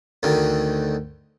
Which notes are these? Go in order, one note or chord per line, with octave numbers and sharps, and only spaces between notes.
D2 D3 D#3